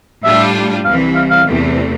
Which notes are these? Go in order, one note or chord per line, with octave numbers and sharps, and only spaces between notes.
A2 G3 D4 F4 E5
C2 C3 E3 F5
F5
F5
E2 C3 E3 A3